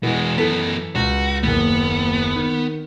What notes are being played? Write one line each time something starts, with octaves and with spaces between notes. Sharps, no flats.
B2 E3 G#3 B3
F#2 E3 B3 A4 B6
C#2 F#4
F#1 D#2 B3
D#3